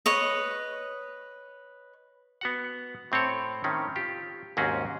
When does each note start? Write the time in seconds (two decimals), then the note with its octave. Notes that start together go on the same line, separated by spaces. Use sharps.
0.06 B4 C#5 D#5
2.41 B3 F#4 F#5
3.12 A2 C4 A4 C#5
3.64 A2 D#3 C4 C#4
3.96 F4 G4
4.57 D#2 G#2 C4 C#4 F#4 G#4